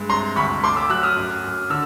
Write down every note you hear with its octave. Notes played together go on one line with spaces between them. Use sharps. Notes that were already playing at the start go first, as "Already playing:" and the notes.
Already playing: G2 G#3
C3 A#5 C6
D2 B5 C#6
A3 C6 D6
D6 E6
F#3 E6 F#6
D#6 F6
F#2
F#2
D3 E6